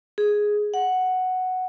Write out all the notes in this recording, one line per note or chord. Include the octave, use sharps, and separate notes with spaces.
G#4
F#5